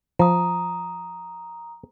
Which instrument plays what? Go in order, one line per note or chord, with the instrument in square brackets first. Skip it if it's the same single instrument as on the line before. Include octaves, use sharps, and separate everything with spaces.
[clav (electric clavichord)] F3 [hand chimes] A#5 D#6